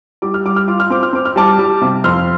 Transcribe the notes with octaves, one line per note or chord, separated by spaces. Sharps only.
G3 D6
F6
G3 D6
F6
F4 D6
F6
C4 D6
F6
C4 D6
F6
G3 A5 D6
G3
C3
F2 C6 F6